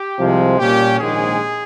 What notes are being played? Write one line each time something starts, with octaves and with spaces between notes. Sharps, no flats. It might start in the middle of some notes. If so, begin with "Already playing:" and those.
Already playing: G4
C2 C3 F3 G#3
A#2 G3 A#3 C#4 G4
A#1 G#2 D#3 G#3 C#4 G#4